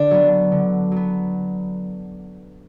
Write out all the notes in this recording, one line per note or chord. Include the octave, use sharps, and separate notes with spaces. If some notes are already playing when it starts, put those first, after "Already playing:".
Already playing: D3 D4
F#3 B3
D3
F#3 B3